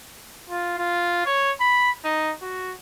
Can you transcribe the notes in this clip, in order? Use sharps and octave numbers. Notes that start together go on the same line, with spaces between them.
F4
F4
C#5
B5
D#4
F#4